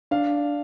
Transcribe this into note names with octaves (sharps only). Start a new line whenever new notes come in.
D4 F5